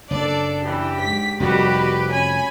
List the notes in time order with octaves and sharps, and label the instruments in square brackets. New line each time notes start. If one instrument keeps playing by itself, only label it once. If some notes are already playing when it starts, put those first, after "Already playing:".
[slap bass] F#1 [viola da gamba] D4 A4 [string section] D5
[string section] E3 [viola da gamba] G4
[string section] G#2 B6
[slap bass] F1 F2 [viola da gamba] D#3 G3 F#4 [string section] G4 B4
[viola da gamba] C#4 [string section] G#5 B5